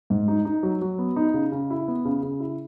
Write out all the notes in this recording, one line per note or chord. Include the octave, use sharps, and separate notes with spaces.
G#2
D#4
D#4
F#3
F#3
B3
D#4
C#3
C#3
E4
B3
C#3
C#3
E4